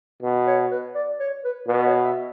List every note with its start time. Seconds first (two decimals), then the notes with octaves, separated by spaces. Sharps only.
0.22 B2
0.47 C#5
0.71 B4
0.95 D5
1.20 C#5
1.44 B4
1.67 B2 B4
1.86 C#5
2.05 E5